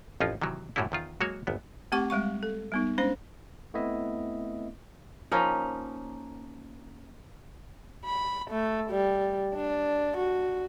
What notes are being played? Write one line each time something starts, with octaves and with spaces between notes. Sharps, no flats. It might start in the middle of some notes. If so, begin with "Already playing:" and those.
A1 F2 F3 C#4 D#4 F4
C3 D#3 E3 F#3
F#2 A2 F#3 G3 C#4 E4
E2 D#3 F4
F#3 G#3 A#3 F#4 C#5
G#1 E2 B3
A3 C4 G4 F#5 C#6 D6
G3 G#3 F5 C#6
A4
G3 B3 D#4
G#3 C#4 D4 C5
A3 B3 C4 E4 D#5 E5
F3 A#3 C#4 D#4
B5
A3
G3
D4
F#4